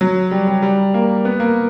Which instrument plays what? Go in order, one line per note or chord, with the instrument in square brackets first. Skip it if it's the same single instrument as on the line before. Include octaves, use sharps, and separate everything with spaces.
[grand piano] F#3
G3
G3
G3
A#3
B3
A#3